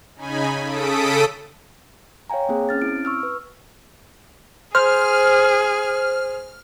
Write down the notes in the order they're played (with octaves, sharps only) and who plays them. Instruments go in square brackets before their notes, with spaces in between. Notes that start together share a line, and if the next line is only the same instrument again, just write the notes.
[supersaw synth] C#3 D#4 G#5 B5
C#3 A4 D#6 B6 D7
[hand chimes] C#5 F5 G5 G#5 A#5
A#3 C4 G#4
C#4 F6 A6
C4 E4 D7
C#6 E6 F6
B4
[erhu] G#4 [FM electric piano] C5 [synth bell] F6